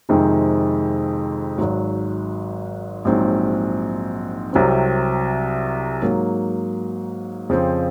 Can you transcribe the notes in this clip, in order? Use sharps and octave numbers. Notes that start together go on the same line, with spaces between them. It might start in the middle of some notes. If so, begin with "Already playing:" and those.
F2 C3 D#3 G#3 C4
G#1 G#2 F#3
A#1 G#2 F#3 C4
C2 C3 F#3 C4
G#2 F#3 A#3
F2 C#3 F3 C4